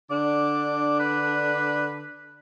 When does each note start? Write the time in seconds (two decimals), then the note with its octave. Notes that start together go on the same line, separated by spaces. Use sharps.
0.10 D3 D4 D6
1.00 B4